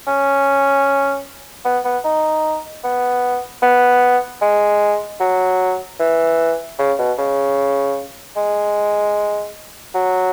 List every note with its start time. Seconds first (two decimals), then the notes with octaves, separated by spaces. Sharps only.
0.07 C#4
1.65 B3
1.84 B3
2.04 D#4
2.84 B3
3.62 B3
4.41 G#3
5.20 F#3
5.99 E3
6.78 C#3
6.98 B2
7.18 C#3
8.36 G#3
9.94 F#3